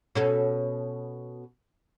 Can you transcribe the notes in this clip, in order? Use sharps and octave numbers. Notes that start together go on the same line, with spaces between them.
B2 C#4 A4